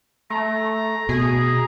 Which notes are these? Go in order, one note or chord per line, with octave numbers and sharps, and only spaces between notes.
A3 A#5
B2 G#4